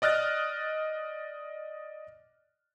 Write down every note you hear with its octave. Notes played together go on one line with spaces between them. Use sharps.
D5 D#5 F6 F#6 A6